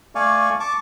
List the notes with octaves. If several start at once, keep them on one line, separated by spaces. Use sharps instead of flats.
A3 D5 F5 G#5 C#6
A5 C#6 D6